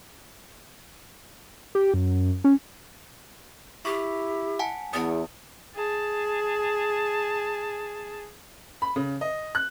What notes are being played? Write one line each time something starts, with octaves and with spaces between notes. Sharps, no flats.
G4
F#2
C#4
E4 G4 C#6
F#5 G#5 A5
E2 B3 A5 D#6
G#4 A5
B5
C#3
D#5
F#6